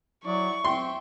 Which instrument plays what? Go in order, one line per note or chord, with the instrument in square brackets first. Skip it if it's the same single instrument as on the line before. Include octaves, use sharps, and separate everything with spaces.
[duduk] F#3 [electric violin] E4 D5 [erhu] C#6
[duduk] C4 [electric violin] E5 G5 [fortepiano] C6